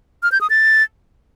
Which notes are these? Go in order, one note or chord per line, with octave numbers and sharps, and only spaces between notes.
F6
G6
D#6
A6